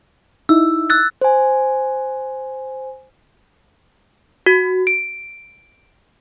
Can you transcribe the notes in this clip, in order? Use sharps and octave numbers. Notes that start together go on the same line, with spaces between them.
D#4 E4 E6
E6 F#6 A6
C5 G#5
F#4
D7